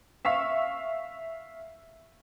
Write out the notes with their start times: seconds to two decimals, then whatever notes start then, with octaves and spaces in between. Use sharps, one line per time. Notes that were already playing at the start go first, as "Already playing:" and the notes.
0.25 E5 F5 C#6 B6